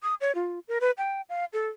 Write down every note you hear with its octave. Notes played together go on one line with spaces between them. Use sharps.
D#6
C#5
F4
A#4
B4
G5
F5
A4